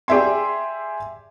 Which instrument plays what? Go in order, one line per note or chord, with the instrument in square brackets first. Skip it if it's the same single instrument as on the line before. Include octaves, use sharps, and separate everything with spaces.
[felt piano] G4 G#4 D5 E5 G#5 C6